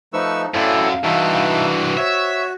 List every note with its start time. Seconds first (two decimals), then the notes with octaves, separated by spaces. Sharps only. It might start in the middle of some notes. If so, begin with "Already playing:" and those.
0.13 F3 A3 D#4 B4 C5 C#6 E6
0.54 F#2 A2 C4 E4 A4 C5 D5 F5
1.03 G2 E3 D#4 F#4 E5 A5
1.97 C5 C#5 E5